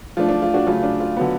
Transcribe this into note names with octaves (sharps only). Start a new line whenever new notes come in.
F3 A3 D4 F4
D4
F4
D4 F#4
C#3 F#3 A3 F4
D4
F4
D3 F#3 B3